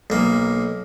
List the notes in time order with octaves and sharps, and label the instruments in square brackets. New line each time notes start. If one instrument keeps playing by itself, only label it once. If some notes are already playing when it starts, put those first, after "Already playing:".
[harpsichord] B1 A#3